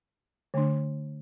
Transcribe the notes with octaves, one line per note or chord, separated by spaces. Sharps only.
D3 A3 D4